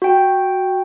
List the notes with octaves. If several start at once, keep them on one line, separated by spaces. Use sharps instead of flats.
F#4 G5